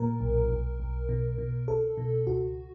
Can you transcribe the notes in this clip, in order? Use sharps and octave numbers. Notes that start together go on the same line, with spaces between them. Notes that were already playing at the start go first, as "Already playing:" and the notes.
Already playing: A#2 A#4
B1
B1
B1
B2
B2
C2 A4
B2
C#2 F#4